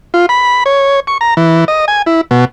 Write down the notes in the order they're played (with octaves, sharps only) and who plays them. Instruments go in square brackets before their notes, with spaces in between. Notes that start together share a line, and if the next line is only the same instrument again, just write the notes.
[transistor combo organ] F4
B5
C#5
C#6
A#5
E3
D#5
G#5
E4
B2